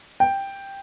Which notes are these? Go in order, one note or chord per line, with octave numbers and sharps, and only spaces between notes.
G5